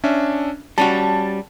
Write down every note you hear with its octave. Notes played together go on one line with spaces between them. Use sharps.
C#4 D4 E5
G3 C#4 F#4 A5